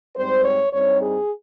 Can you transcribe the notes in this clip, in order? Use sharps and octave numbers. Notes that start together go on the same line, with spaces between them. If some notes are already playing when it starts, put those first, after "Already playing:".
G#2 G3 C4 C5
C#5
G2 G3 C4 D#4 C#5
G#4